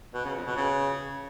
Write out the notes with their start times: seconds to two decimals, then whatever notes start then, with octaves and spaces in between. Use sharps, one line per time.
0.14 B2
0.25 C#3
0.35 F2
0.46 B2
0.56 C#3